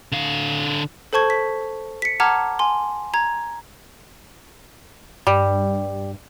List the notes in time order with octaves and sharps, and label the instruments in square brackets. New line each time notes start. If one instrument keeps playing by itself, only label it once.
[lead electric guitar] D3 F5
[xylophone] A4 C5 A5 C#6 G#6
B6
B6 C#7
F#5 A5 A#5 D6 F6 G#6
G#5 C6
A#5 G#6
[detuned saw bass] G2 [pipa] G3